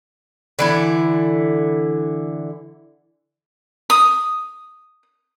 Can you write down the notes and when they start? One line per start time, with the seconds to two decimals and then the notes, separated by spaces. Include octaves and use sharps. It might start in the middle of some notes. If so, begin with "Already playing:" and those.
0.59 D3 E3 E4
3.90 D#6